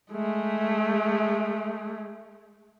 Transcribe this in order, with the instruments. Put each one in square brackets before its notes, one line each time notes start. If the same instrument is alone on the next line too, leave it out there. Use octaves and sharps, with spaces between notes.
[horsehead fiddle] G#3 A3